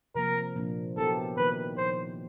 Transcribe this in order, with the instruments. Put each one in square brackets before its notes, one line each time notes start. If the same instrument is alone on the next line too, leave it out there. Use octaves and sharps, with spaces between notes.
[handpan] C3 F3 A#3 [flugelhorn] A#4
[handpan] A#2 F3 A#3 D4
[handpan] F#3 B3 E4 G4 A#4 [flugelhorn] A4
[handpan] D#3 F#3 A#3 D#4 [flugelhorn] B4
[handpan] A#2 F3 A#3 D#4 [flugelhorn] C5